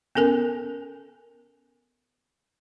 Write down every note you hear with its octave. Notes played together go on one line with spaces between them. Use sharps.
B3 C#4 A4 A#4 G#5